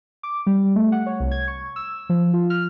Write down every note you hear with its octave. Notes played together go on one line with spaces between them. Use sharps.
D6
G3
A3
F#5
C#5
C2
G#6
C#6
E6
F3
F4
F6